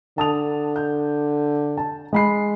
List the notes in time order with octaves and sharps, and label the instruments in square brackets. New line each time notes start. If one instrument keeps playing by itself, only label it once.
[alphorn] D3 [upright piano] A5 D#6 F7
[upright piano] G6
A5
G#3 B5 C7